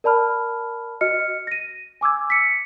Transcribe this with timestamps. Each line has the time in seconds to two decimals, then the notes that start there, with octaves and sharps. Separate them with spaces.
0.04 A#4 D5 A5 B5 F6
1.01 F#4 D#5 F6 C#7
1.47 A#6 D#7
2.01 G#5 D6 E6 G#6
2.30 B6 C#7